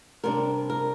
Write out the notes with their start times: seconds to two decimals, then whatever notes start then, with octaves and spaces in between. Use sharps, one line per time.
0.24 C3 G3 D4 A#4
0.70 A#4